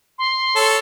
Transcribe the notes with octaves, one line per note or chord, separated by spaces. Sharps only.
C6
A4 C#5